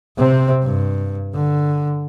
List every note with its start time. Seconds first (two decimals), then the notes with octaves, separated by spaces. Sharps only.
0.17 C3 C4
0.63 G2
1.34 D3